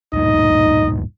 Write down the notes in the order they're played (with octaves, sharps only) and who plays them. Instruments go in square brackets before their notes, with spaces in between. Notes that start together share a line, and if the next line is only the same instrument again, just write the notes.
[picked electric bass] D1 G2 A#2 [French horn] D#4 [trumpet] D#5